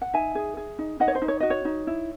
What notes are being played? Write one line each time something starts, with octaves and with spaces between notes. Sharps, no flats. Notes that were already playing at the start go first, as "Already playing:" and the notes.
F#5
D#4 E5 G#5
G#4
G#4
D#4
D#4 D#5 F#5
C#5
C5
D#4
C#5
F#4 D#5
C#5
D#4
E4